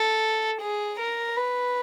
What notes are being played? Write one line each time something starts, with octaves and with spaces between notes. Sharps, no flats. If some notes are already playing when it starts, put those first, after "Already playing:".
Already playing: A4
G#4
A#4
B4